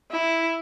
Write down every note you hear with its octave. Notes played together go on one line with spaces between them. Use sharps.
E4